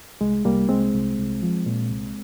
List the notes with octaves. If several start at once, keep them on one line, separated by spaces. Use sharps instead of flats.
C2 G#3
C2 G3 A#3
C2 G#3 C4
C2
C2
F3
A#2
C2